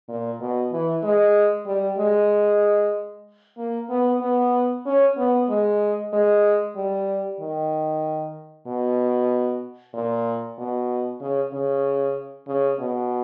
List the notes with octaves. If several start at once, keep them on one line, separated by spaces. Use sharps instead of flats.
A#2
B2
E3
G#3
G3
G#3
A#3
B3
B3
C#4
B3
G#3
G#3
G3
D#3
B2
A#2
B2
C#3
C#3
C#3
B2